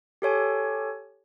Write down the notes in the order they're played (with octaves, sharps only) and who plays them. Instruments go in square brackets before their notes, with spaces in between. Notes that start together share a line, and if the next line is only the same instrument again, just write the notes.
[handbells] G4 A4 C#5 G#5